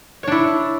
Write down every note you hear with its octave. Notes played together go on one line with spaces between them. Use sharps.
D4 E4 C#5